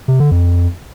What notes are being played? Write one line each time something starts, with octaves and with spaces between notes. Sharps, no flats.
C3
D3
F2